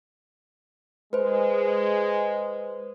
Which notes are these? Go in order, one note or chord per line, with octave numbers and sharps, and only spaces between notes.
G#3 B4 C5